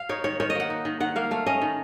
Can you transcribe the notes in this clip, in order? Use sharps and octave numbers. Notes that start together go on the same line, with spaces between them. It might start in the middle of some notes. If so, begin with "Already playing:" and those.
Already playing: F5
D#4 C#5
D#3 C#5
D#3 C#5
D#5
A#3 F#5
D#4
D#3
D#3 F#5
A#3 F5
A3 F5
C#4 D#5
D#3